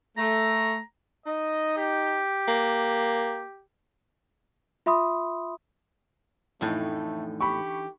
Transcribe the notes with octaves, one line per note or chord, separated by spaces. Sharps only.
A3 A#5
D#4 D#5
G4
A#3
F4 E5 B5 C6 D#6
F2 A2 D3 E3 A3 D#4
G4 B5 C#6